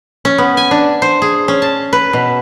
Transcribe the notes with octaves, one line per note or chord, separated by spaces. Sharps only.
C#4
B3
G#5
D4
C5
G#4
C#4
A5
B4
B2